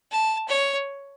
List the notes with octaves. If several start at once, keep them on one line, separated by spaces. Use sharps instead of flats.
A5
C#5